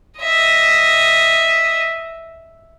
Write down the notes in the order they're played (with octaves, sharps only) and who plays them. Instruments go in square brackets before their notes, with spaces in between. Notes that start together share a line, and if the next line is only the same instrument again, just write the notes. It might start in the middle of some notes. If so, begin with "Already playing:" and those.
[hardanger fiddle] D#5 E5